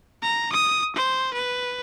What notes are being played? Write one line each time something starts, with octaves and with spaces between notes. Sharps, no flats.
A#5
D#6
C5
B4